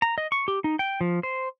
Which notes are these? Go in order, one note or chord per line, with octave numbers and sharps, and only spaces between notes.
A#5
D#5
C#6
G4
D#4
G5
F3
C5